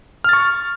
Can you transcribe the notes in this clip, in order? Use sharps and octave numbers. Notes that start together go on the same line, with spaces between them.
C#6 F6 A6